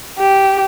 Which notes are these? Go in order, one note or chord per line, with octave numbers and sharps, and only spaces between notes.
G4